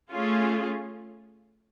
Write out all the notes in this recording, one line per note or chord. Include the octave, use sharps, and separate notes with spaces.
A3 C#4 F4 G#4